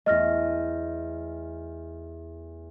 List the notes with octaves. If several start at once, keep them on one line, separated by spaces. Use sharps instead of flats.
E2 A3 D#5 F6 A#6